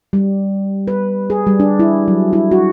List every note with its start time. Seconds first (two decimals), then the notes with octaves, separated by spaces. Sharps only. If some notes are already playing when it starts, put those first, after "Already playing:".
0.13 G3
0.88 B4
1.30 G#4
1.47 G3
1.60 D4
1.79 E4
2.08 F#3
2.33 E4
2.51 F#4